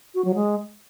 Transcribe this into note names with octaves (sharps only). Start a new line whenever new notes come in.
F#4
F#3
G#3